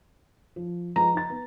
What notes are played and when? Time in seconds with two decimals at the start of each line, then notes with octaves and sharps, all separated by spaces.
0.56 F3
0.96 F3 G#3 B4 A#5
1.14 D#4 A6
1.30 B3